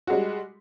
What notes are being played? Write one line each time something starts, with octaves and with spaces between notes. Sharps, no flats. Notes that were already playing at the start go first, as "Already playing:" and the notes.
G3 G#3 F#4